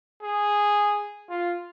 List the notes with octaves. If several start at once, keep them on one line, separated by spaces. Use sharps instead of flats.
G#4
F4